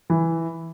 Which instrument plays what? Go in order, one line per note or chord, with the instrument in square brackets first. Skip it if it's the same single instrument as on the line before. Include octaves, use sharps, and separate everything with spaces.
[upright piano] E3